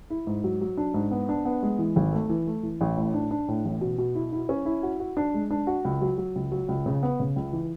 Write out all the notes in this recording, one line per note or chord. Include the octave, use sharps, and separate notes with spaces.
E4
G#2
F#3
F#3
D4
G#2
B3
D4
B3
G#3
E3
G#1
A3
E3
A3
E3
A1
A2
D4
D4
A2
A1
B2
B2
E4
E4
C#4
E4
F#4
F#4
D4
G#3
D4
F#4
C#2
F#3
F#3
C#2
F#3
C#2
C#3
B3
C#3
C#2
E3